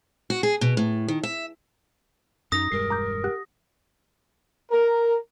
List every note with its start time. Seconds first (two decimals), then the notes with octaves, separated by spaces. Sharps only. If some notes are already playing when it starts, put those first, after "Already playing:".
0.30 F#4
0.43 G#4
0.61 B2
0.77 A2
1.08 D#3
1.23 E5
2.52 F#2 D#4 D#6 A#6
2.72 E1 G2 G#3 A#4 C7
2.90 A#5 D6 G6
3.24 G4 F#5 F#6
4.71 A#4